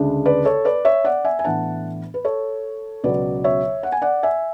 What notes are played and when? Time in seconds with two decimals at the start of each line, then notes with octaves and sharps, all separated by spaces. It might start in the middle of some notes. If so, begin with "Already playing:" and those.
Already playing: D2 C#3 G#3 D4
0.25 B4 D5
0.45 A4 C#5
0.65 B4 D5
0.85 C#5 E5
1.04 D5 F#5
1.25 E5 G#5
1.39 G#5
1.44 A2 E3 B3 D4 F#5 A5
2.14 B4
2.25 A4 C#5
3.04 C#2 B2 F#3 B3 B4 D5
3.44 C#5 E5
3.83 F#5
3.92 G#5
4.02 D5 F#5
4.23 E5 G#5